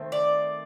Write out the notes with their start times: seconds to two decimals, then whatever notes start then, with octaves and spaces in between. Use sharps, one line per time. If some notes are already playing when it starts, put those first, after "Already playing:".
Already playing: D#3 A3 C4
0.12 D5